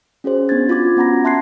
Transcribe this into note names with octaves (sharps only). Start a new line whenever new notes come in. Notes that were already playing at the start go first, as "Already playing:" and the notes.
C#4 F#4 G#4 C5
B3 D4 G#6 A6
F4 F#4 D6 G#6
B3 C#4 F#5 A#5 B5 A#6
E5 A5 C6 F#6 G#6 C7